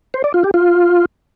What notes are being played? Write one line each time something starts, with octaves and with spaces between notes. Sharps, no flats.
C5
D5
F4
G4
F4